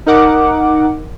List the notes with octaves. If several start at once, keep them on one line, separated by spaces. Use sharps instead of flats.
D#4 A#4 F#5 D6